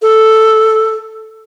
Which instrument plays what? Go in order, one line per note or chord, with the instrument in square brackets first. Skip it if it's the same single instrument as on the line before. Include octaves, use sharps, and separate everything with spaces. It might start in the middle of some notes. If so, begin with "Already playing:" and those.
[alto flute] A4